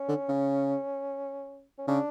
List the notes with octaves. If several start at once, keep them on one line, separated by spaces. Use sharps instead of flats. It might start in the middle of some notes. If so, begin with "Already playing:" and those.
Already playing: C#4
D3
C#3
C#4
C#3 D4